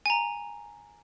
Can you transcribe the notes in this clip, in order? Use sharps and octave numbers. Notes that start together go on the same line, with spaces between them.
G#5 A#5